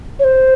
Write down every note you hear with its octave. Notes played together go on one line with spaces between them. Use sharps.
C#5
C5